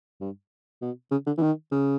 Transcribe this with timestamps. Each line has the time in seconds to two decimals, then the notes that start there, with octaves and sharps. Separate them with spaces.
0.21 G2
0.82 B2
1.11 C#3
1.26 D3
1.38 E3
1.42 D#3
1.71 C#3